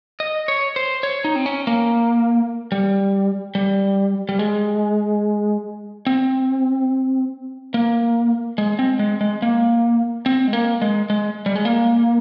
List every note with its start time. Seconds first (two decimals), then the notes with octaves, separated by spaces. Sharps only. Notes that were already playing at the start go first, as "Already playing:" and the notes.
0.20 D#5
0.48 C#5
0.76 C5
1.03 C#5
1.25 D#4
1.36 C4
1.46 C#4
1.67 A#3
2.72 G3
3.55 G3
4.29 G3
4.39 G#3
6.07 C4
7.74 A#3
8.58 G#3
8.79 C4
8.99 G#3
9.21 G#3
9.42 A#3
10.26 C4
10.48 G#3
10.53 A#3
10.82 G#3
11.10 G#3
11.46 G3
11.55 G#3
11.65 A#3